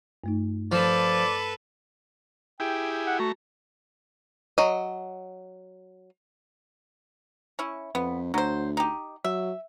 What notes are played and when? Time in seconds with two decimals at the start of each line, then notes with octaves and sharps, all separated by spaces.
0.24 G2 A3 D#4
0.72 F3 A4 B4 D5
2.60 E4 G4 G#4 G5
3.06 F#5
3.19 A3 F#4 A#5
4.58 F#3 D#5
7.59 C#4 E4
7.95 F2 B3
8.34 D2 F#3 C5
8.77 D#4 G4
9.24 F#3 E5